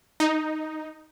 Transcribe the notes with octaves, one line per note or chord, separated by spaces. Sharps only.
D#4